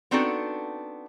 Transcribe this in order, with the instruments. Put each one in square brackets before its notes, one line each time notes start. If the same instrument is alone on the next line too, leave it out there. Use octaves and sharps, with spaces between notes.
[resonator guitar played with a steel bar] B3 C4 D4 D#4 F#4 A4